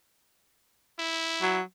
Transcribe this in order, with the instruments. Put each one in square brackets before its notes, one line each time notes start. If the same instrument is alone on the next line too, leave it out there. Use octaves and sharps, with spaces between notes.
[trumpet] E4
[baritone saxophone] F#3